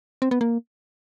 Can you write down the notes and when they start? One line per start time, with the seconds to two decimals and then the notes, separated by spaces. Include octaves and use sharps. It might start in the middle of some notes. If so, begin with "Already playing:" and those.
0.22 C4
0.31 B3
0.41 A#3